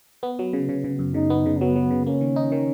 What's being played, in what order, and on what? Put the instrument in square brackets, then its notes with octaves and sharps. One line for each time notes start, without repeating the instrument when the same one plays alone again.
[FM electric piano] B3
F#3
C#3
C#3
C#3
F#2
[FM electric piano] C#3 [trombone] D#4
[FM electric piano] B3
C#3
[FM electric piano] F#3 [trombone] B3
[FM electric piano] F#3
C#3
[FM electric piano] A#3 [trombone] C#4
[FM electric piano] D#3
D#4
D#3